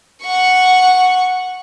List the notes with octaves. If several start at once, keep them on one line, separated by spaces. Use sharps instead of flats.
F#5 C#6